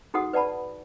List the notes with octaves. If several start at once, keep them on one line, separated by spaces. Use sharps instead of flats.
D#4 F#4 G#4 A4 F#5 D#6
B4 D5 F#5 A5 B5